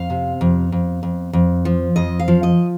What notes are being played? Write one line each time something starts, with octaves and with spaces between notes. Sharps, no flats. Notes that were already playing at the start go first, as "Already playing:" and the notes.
Already playing: F2 F5
C3
F2
F2
F2
F2
F3
F2 D#5
F5
F3
D#5